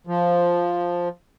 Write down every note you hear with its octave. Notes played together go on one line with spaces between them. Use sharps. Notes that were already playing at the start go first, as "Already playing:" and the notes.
F3